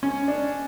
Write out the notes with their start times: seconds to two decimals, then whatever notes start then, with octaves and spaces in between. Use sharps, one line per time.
0.03 C#4
0.28 D4